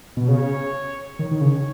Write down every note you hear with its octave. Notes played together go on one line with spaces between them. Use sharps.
B2
C#3 C#5
D#3 C#5
D#3
C#3